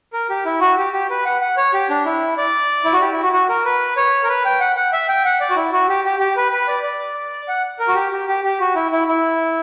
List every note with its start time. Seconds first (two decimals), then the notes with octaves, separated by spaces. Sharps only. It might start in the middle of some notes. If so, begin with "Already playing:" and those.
0.13 A#4
0.30 G4
0.45 E4
0.61 F#4
0.77 G4
0.93 G4
1.10 B4
1.25 F#5
1.41 F#5
1.57 C#5
1.73 G4
1.90 D4
2.05 E4
2.38 D5
2.85 E4
2.93 F#4
3.01 G4
3.12 E4
3.23 F#4
3.33 F#4
3.49 A#4
3.65 B4
3.97 C#5
4.23 A#4
4.29 B4
4.45 G5
4.60 F#5
4.76 F#5
4.93 E5
5.08 G5
5.25 F#5
5.40 D5
5.50 F#4
5.56 E4
5.72 F#4
5.89 G4
6.05 G4
6.19 G4
6.37 B4
6.52 B4
6.68 D5
6.83 D5
7.48 F#5
7.79 A#4
7.88 F#4
7.95 G4
8.12 G4
8.28 G4
8.44 G4
8.60 F#4
8.75 E4
8.92 E4
9.08 E4